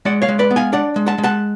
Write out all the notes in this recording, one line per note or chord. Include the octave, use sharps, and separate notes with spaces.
G#3 D5 F#5
C#5 F5
G#3
B4 D5
B3
F5 G#5
D4 D5 F#5
G#3
F#5 A5
G#3
F#5 A5